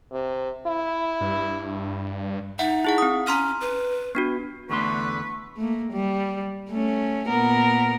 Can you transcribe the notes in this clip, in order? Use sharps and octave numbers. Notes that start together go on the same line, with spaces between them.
C3
E4
G2
D#4 E5 F#5
E4 G#4 F#5
C4 D#6
C#4 A#5 C6 F6
B4
B3 D4 F#4
E2 D3 A3 B4 C6 C#6
A3 A#3
G3
A3 C#4
A#2 B3 A#4